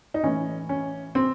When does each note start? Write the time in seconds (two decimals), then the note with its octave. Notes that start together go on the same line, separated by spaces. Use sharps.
0.14 D#4
0.24 A2 E3 C#4
0.69 C#4
1.15 C4